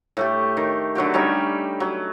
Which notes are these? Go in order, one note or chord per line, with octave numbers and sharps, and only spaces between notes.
A2 A3 G4
D#3
D3 F#3 F#4 G4
G3 C#4 D#4 E5
F#3